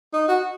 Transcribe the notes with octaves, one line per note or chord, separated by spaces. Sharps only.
D#4
F#4